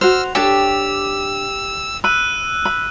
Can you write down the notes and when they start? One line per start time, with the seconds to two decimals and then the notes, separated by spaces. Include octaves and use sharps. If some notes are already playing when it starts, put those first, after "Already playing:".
0.01 F#4 C5 E6 F6 F7
0.35 D4 G4 A4 C#5 E6
2.04 B5 E6 F#6 D#7
2.65 B5